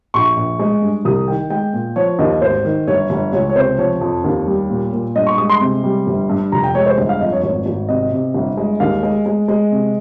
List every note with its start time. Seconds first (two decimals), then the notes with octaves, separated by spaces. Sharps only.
0.14 A#1 C#6
0.36 A#1
0.59 G#3
0.82 G2
1.05 C2 D#6
1.28 D#3 G5
1.50 G#3 G5
1.73 A#2
1.96 F3 C#5
2.19 D#2 D#5
2.42 G#1 C5
2.65 D#3
2.88 G1 C#5
3.10 G1
3.33 C#2 C#5
3.50 C#5
3.56 C3 C5
3.78 F3 C#5
4.01 F2
4.24 D#2
4.47 G3
4.70 A#2
4.92 A#2
5.15 G2 D#5
5.27 C#6
5.38 G#3 D#6
5.49 C6
5.61 C3
5.84 G3
6.07 G1
6.29 G2
6.52 F1 A#5
6.64 G5
6.74 G#3 C#5
6.86 C5
6.98 G1
7.09 F5
7.21 F2 D#5
7.32 C#5
7.43 G#1 C#5
7.66 G#1
7.89 C3 D#5
8.12 C3
8.34 G1
8.57 G#3
8.80 D#2 F5
9.03 G#3
9.26 G#3
9.48 G#3
9.71 C3